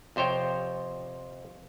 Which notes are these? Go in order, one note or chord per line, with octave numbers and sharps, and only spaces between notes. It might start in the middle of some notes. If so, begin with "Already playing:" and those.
F2 C3 C5 C#5 G5